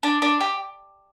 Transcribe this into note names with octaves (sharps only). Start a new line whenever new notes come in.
D4
D4
G4